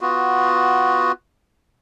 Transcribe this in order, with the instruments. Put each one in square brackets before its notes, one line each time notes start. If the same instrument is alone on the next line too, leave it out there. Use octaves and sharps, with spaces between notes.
[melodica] B3 F4 F#4